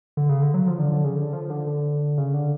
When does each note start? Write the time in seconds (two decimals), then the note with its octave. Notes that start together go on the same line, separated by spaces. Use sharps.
0.17 D3
0.29 C#3
0.42 D3
0.54 F#3
0.67 F3
0.79 D3
0.92 D3
1.04 C#3
1.16 D3
1.33 F3
1.50 D3
1.67 D3
2.18 C#3
2.34 D3